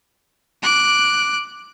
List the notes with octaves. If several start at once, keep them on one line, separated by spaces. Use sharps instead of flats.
D6 F#6